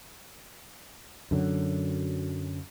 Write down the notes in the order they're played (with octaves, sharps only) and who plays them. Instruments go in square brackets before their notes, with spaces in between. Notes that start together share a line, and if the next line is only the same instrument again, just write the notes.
[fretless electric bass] F#2 D3 F#3